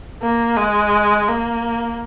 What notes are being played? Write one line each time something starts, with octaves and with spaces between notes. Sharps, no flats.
A#3
G#3
A#3